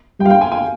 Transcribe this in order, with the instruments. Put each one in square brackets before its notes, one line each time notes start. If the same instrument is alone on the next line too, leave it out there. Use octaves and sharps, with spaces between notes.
[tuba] G3 [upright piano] G5
[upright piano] F5
G5
G#5
G#5